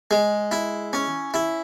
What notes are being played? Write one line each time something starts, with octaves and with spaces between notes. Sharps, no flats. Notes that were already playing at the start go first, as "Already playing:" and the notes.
G#3
E4
C#4
E4